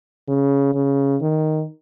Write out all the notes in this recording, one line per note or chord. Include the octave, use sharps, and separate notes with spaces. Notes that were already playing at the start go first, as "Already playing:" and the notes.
C#3
C#3
D#3